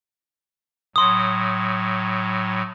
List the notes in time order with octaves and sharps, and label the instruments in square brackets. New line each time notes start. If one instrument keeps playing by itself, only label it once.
[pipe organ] A2 F#3 [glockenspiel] C6 D#6